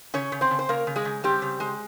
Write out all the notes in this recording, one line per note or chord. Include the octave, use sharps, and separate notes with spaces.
C#3 C#4 C#5
C#3
C4 C5
C#3
C5
C#3 A#3 A#4
C#3
G#3 G#4
C#3
G3 C4 G4
C#3
G#3